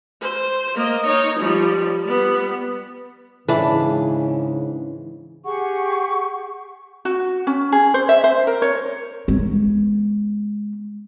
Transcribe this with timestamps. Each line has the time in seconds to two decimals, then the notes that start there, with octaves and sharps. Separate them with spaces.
0.21 C5
0.75 A#3 D#5
1.07 D#4 C#5
1.40 F3 G3
2.04 G3 B3
3.48 G#2 C#3 E3 D4
5.44 G4 G#4 F#5 C#6
7.05 F#4
7.47 C#4
7.72 G#4
7.94 C5
8.09 E5
8.24 C5
8.47 A#4
8.62 C#5
9.28 G#3 B3